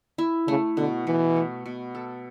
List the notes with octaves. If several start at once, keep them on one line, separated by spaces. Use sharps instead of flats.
E4
C#3 A3
B2 D3
B2 E3
A3
B2
A4